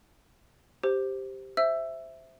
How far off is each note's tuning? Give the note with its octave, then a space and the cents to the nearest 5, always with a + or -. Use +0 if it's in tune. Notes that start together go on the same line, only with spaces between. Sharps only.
G4 +0 C5 +0
C5 +0 E5 +0 E6 +15